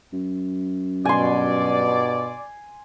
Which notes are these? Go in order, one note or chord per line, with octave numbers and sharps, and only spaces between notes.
F#2
G2 B2 D5 G#5 C6